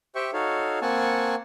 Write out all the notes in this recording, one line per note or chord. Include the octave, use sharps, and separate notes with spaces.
G4 C5 E5 G5 C#6
D#4 F#4 A4 C#5 F5
A#3 C4 F#5 G#5 A5 C#6